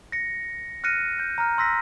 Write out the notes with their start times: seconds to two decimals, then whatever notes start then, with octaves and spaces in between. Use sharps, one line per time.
0.12 A#6 C#7
0.84 F6 F#6 A#6 C#7 D#7
1.19 G6
1.38 A#5 F6
1.58 C6 E6 A#6 B6